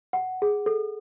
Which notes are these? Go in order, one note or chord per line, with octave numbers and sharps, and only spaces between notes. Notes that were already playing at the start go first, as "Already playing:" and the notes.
F#5
G#4
A4